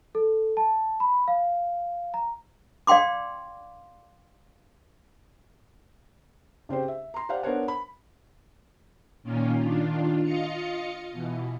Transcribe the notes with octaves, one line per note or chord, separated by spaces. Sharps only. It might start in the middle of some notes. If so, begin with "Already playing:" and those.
A4
A5
B5
F5
A#5
D5 F5 G5 C6 D6
C#3 C4 G4 C5
E5
A#5 C6
G4 C5 D5 F5 F#5
B3 D4 A#4 C5 C#5 F#5
B5
A#2 D#3 A#3 C#4 F4
D#3 D4 F4
F4 D#5 F5 C#7
B2 E3